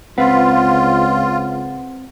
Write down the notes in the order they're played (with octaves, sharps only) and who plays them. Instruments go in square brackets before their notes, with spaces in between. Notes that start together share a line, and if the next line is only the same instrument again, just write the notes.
[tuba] C#2 [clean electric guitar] C4 B4 [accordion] F4 [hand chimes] F#5